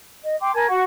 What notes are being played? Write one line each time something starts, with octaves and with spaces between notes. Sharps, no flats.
D#5
G5 C6 D6
A#4 G#5 A5 G#6
F#4 F#5 C#6